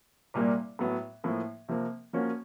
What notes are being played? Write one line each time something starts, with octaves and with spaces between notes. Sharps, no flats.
C2 A#2 G3 A#3
A2 F#3 B3
A2 F3 A#3
C3 F3 A#3
F3 A#3 C#4 F#4